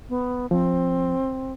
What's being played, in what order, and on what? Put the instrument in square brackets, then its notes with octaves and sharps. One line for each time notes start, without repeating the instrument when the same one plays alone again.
[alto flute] B3
[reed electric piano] F3 [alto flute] C4